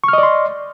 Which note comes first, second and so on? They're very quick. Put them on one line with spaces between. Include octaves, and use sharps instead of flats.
C#6 F6 D#5 D5 C6